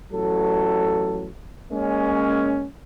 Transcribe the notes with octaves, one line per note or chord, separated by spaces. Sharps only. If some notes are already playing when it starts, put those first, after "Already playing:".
A1 F#3 A4
G#3 A#3 C#4